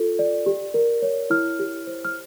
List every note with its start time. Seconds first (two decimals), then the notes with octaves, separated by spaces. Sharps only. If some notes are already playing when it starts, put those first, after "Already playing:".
Already playing: F4 A4
0.19 D5
0.46 G4
0.74 A#4
1.02 C#5
1.30 E4 F6
1.59 G4
1.87 C5
2.05 F6